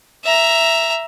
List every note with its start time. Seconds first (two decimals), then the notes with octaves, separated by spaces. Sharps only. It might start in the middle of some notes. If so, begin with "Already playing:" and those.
0.24 E5 A#5